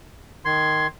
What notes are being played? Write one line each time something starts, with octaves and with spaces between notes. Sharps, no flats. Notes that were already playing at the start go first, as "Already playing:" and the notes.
D#3 C6 G#6